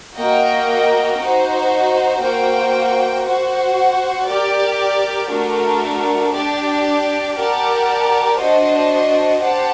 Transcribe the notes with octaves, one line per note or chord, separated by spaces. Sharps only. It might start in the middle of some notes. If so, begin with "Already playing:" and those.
A#3 F#4 A#4 D#5 G5
D#4 F#4 C5
A#3 F#4 C5 G5
F#4 C5 F#5
G4 A#4 D5
A3 D4 F#4 A#4
D4 G4 D5
G4 A#4 D5 F#5 A5
D4 F#4 C5 D#5
G4 C5 F#5 A5